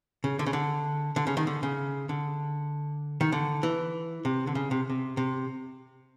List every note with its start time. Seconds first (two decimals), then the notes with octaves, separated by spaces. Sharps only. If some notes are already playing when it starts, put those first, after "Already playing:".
0.24 C#3
0.39 D3
0.46 C#3
0.53 D3
1.16 D3
1.27 C#3
1.37 D#3
1.47 D3
1.63 C#3
2.09 D3
3.21 D#3
3.32 D3
3.63 E3
4.25 C3
4.47 D3
4.55 C#3
4.71 C3
4.90 C3
5.17 C3